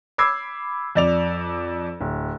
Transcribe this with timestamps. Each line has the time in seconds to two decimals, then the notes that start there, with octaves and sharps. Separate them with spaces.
0.18 B5 D6 E6 G#6 C7
0.95 F2 D5 F7
2.01 D1